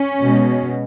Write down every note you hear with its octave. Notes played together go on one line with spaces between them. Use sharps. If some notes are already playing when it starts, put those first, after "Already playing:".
Already playing: C#4
B2 G#3